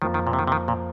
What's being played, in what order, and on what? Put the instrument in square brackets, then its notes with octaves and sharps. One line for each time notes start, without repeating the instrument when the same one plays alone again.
[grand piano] F2 F3 A#3 F4 [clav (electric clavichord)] D#3
[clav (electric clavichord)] D#3
A#2
C3
D#3
C3
D#3
A#2